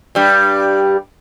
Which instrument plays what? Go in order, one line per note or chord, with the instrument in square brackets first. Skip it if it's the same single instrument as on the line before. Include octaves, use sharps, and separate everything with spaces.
[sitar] G2 G3